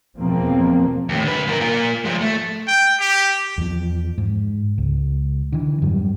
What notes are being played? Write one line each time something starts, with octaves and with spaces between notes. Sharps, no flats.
E2 B2 F3 A#3 C4
D#2 A2
D3 B4
F3 A#4
A#3 F4
F3 G#3
A3
G5
G4
E2 F3
G#2
C#2
D3 E3
F2 G#2 F#3 G3